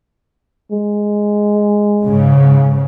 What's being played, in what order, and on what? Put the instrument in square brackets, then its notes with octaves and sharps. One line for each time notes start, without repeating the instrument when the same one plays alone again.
[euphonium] G#3
[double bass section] G#2 C#3